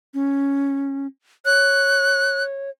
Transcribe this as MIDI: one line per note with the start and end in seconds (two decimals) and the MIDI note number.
0.14 1.07 61
1.45 2.70 73
1.45 2.43 90